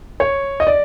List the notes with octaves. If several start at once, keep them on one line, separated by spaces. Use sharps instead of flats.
C#5
D#5
D5